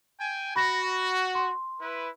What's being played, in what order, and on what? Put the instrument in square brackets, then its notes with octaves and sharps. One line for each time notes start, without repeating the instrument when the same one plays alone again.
[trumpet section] G5 G#5
[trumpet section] F#4 [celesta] B5 A#6
[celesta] C6
[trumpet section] E4 B4